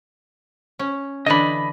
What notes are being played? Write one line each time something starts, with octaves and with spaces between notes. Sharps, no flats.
C#4
D3 E3 D4 D#5 B5